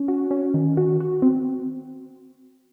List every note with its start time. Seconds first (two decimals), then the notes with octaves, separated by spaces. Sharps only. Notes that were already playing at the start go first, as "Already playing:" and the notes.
Already playing: C#4
0.08 F#4
0.31 C#4
0.54 D#3
0.77 F#4
1.00 F#4
1.22 C4